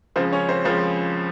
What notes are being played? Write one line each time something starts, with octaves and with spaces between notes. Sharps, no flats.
C#2 C#3 F3 C4 C5
C#4 C#5
C4 C5
C#2 C#3 F3 C4 C5